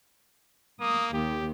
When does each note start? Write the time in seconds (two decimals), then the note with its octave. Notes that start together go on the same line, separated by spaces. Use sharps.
0.80 A#3 D#6
1.13 D#2 G4